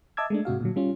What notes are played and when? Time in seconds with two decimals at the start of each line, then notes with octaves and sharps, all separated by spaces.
0.17 D#5 E5 A5 D6 E6 G#6
0.30 G#3 A3 D4
0.45 G#2 C3 F#4 F5
0.61 A#2 D3 F#3
0.76 G3 C#4 F4